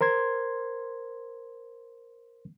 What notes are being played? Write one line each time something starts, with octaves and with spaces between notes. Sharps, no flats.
A#4 C5 C6 G#6